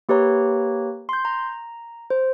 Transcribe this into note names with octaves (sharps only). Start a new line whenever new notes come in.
A#3 G4 B4 C#5 A#5
C6 G6
A#5
C5